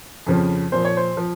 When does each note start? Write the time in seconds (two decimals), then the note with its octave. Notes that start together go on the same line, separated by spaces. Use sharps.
0.26 F2 C#3 F3
0.72 A#2 F3 C5
0.85 C#5
0.97 C5
1.17 F3